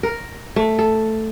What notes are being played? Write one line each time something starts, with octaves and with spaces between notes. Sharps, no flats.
A#4
A3
A4